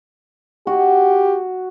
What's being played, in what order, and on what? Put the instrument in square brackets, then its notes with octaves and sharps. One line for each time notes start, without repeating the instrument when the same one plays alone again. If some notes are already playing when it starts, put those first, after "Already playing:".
[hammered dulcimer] F#4 [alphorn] G4